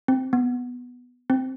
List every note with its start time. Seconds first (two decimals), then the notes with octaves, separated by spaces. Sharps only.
0.08 C4
0.33 B3
1.30 C4